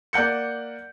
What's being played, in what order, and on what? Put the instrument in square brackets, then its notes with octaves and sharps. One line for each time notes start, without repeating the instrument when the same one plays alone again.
[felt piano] A#3 D5 F#5 G6 C#7